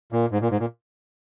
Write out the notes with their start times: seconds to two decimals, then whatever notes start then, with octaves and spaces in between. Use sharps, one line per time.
0.12 A#2
0.31 G#2
0.41 A#2
0.51 G#2
0.60 A#2